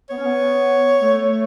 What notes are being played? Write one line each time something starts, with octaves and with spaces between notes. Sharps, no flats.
B3 C#5
C#4
B3
A3